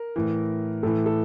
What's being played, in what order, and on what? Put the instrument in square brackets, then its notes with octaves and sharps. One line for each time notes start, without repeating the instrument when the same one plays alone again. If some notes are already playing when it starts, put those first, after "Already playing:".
Already playing: [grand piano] A#4
A2 E3
A2 E3 A4
A4